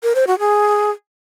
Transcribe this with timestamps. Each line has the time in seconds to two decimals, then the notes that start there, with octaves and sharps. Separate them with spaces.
0.03 A#4
0.15 C5
0.27 F#4
0.39 G#4